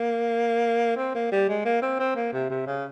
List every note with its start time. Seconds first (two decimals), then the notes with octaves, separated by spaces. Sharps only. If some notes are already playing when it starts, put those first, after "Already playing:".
Already playing: A#3
0.97 C4
1.15 A#3
1.32 G3
1.49 G#3
1.65 A#3
1.82 C4
1.99 C4
2.16 A#3
2.33 C3
2.50 C3
2.67 C#3